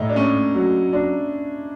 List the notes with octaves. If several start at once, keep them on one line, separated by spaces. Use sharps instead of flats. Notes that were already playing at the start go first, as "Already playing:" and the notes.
Already playing: A2 D#4 E4
D4
A3 C#4
F#3
D4